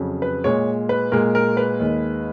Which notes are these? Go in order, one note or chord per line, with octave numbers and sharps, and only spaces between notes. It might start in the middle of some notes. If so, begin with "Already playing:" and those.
Already playing: F2 C#3 F#3
B4
A#2 G#3 C#5
B4
A#2 G#3 A#4
A#4
B4
D#2 D#3 G#3